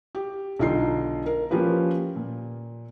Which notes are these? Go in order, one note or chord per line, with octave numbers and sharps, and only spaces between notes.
G4
B1 D3 D#4 F4 C7
A#4
F3 A#3 C#4 F4 G4 B4
A#2